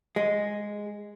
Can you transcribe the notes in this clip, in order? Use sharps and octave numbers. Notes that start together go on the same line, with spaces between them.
G#3